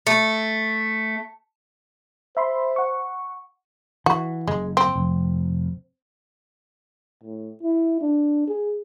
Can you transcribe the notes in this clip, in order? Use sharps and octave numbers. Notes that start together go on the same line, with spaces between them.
A3
C5 E5 B5 C6
F#5 C#6
E3 F#4
F#1 G#3
C4
F1
A2
E4
D4
G#4